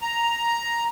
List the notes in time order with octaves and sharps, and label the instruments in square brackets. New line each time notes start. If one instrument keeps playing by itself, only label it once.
[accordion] A#5